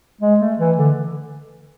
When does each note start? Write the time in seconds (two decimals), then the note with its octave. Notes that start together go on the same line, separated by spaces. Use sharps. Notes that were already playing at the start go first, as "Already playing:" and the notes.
0.21 G#3
0.40 A3
0.59 E3
0.78 D3